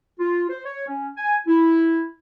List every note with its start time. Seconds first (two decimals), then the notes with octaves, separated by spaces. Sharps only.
0.19 F4
0.49 C5
0.64 C#5
0.87 C#4
1.17 G#5
1.47 E4